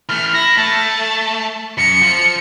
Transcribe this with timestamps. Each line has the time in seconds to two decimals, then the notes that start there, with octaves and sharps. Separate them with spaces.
0.09 E3 A3 F6
0.34 E4 A#6
0.57 A3 A5
1.78 F#2 C#7
2.02 F3